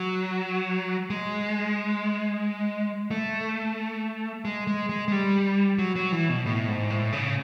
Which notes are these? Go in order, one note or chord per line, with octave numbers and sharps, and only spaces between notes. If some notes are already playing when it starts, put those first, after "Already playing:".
Already playing: F#3
G#3
A3
G#3
G#3
G#3
G#3
G3
F#3
F#3
E3
B2
A2
G#2
A2
C#3